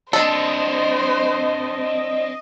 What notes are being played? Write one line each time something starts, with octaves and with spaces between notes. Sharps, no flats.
C4 D4 A4 C5 D#5